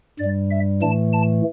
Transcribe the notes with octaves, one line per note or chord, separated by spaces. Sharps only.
G2 G3 D5
E5
A2 E3 A3 A5
A5